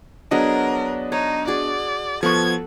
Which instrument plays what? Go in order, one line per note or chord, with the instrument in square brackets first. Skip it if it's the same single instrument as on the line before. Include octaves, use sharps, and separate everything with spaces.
[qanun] F#3 G#4 [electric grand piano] B3 D4 D#5 [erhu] A#4
[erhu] D#4 [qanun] C#5
[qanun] F#4 G#4 [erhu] D5
[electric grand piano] F3 B3 C#6 [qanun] A4 F#5 [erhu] G#6